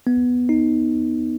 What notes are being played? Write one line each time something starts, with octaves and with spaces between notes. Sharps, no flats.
B3
D#4